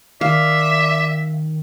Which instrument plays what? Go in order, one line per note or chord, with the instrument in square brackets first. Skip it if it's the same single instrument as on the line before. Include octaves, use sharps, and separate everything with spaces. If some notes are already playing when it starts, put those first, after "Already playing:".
[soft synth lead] D#3 [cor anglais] D5 [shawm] E5 [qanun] F5